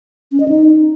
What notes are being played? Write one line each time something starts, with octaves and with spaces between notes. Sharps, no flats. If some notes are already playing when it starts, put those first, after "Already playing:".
C#4
D#5
D#4